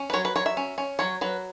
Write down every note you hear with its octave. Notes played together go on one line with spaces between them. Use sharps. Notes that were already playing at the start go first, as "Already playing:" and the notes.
Already playing: C#4
B4
F#3 C#5
B4
F#3 C#5
E5
C#4
C#4
F#3 C#5
F#3 B4